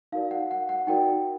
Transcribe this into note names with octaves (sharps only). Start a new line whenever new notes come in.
D#4 F#4 A#4 D5 F5
F#5
F#5
F#5
D#4 F#4 A#4 D5 G5